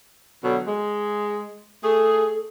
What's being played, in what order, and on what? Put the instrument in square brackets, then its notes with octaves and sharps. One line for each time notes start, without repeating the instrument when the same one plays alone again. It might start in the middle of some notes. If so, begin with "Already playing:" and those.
[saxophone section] B2 D3 F#3
G#3
[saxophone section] A3 G#4 [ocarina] A4